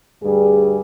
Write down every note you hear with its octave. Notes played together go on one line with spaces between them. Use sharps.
D2 G2 G3 G#4